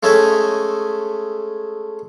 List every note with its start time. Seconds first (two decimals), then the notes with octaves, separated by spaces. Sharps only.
0.03 G#3 A3 C#4 D#5 E5 G#5